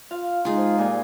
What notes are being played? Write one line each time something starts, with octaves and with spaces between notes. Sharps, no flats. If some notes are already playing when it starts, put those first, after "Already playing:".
F4 F5
G#3 D#4 F4 G#4
F3
A#2 G3 G#5